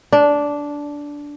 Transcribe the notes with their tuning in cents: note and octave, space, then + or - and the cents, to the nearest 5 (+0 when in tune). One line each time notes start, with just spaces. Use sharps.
D4 -10